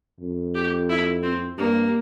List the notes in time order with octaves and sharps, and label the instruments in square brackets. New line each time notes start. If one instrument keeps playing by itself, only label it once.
[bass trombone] F2
[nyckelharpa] G4
E4
C4
[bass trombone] G2 [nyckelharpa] A#3